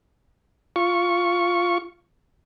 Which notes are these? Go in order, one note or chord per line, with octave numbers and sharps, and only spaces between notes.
F4 C#6